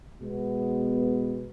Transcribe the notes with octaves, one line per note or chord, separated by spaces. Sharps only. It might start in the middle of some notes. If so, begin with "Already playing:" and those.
B2 G#3 B3